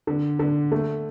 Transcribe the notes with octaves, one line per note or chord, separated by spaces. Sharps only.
D3
D3
A3